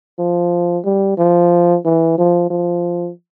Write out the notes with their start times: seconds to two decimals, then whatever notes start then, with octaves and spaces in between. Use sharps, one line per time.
0.19 F3
0.85 G3
1.18 F3
1.85 E3
2.18 F3
2.50 F3